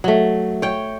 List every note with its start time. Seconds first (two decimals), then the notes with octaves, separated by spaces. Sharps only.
0.04 F#3 A3
0.62 C#5 G5